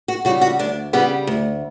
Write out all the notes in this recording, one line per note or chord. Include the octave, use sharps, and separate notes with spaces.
F#4
C#3 G3 F#4
F#4
D2 D4
C#3 G3 B3
D2